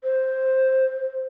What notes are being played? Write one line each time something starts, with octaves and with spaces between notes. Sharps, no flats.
C5